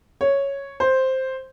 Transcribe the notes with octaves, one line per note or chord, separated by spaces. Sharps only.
C#5
C5